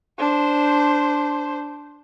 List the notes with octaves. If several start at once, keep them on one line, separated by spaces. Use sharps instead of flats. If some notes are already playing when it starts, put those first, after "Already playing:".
D4 C5